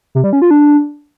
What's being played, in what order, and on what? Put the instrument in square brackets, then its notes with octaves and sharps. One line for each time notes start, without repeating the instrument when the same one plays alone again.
[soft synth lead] C3
G3
C#4
F4
D4